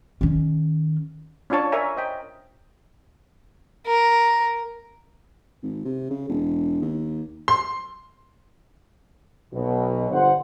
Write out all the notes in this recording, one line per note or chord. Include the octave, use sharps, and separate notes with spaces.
D#3 C#4
C#4 D4 F4 C#5 A5
A#4 C#5 D5 E5 G#5 A#5
C5 D#5 G5
A#4
G#1
C3
C#3
E1
D#2
C6
B1 B2
G1 C5 F#5